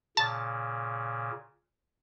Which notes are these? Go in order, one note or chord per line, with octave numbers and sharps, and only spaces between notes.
A#2 C#3 A5